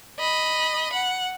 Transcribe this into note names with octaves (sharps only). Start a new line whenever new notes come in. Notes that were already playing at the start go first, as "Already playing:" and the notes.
D#5 B5
F#5